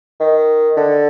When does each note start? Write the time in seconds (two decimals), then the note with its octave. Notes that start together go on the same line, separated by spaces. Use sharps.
0.20 D#3
0.76 D3